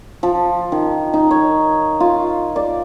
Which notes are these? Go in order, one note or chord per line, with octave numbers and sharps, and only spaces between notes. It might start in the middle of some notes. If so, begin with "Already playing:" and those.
F3
D#3
D#4
C#5
F4
D5